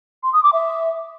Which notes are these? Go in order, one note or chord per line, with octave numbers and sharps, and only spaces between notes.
C6
D#6
D6
E5